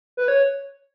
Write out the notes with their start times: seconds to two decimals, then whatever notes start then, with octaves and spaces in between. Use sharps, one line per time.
0.17 B4
0.28 C#5